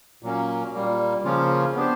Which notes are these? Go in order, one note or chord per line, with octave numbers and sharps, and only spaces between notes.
A#2 F#3 A#3 C#4
A#2 G3 A#3
C#3 F3 A#3 C#4 F4
B3 D4 G4 C5